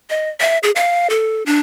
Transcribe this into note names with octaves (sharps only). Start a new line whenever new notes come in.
D#5
E5
G#4
F5
A4
D4